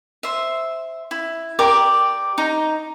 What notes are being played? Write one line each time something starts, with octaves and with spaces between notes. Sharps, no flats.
C5 E5
E4
G4 A#4 D5 D6
D#4 A#5